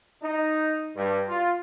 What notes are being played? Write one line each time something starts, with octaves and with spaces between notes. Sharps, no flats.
D#4
G2
F4